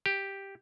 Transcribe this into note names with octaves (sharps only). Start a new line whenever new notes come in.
G4